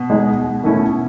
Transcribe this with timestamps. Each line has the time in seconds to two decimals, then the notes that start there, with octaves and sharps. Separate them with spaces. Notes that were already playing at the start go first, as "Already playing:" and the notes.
Already playing: B2
0.10 G#3 D#4 G#4
0.63 D#3 A3 C#4 E4